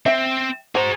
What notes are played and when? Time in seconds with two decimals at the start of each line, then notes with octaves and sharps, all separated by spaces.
0.06 C4 E5 G5
0.75 F#4 G#4 C5 A#5